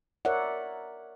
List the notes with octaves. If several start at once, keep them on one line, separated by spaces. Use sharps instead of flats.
A#4 C#5 D5 E5 F#5